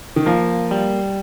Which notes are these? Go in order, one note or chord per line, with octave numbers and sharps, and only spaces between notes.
D#3
F3 A#3
G3